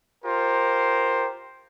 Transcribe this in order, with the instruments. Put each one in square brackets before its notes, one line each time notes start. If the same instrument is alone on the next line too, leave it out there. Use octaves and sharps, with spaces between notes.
[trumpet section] F4 G4 A#4 C5